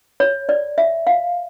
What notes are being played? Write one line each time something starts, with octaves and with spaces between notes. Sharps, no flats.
C#5
D5
E5
F5